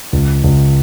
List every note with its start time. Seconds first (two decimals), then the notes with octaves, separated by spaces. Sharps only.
0.13 C#2
0.44 C#2